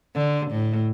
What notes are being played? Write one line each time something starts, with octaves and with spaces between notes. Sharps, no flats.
D3
A2